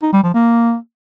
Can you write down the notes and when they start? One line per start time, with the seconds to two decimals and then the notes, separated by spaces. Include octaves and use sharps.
0.02 D#4
0.13 G3
0.23 F3
0.34 A#3